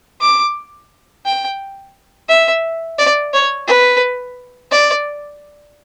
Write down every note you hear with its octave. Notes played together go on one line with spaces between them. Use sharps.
D6
G5
E5
D5
C#5
B4
D5